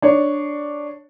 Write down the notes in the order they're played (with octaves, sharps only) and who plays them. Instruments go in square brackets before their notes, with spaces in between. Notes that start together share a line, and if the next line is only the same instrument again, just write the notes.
[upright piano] D4 C#5